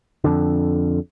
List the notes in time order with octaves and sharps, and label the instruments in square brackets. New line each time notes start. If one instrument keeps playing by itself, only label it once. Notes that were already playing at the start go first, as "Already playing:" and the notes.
[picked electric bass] F2 D3